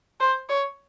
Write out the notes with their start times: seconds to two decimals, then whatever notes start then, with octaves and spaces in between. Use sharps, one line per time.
0.20 C5
0.49 C#5